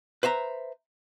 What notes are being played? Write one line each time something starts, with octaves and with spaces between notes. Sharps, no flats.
B4 C5 E5 A#5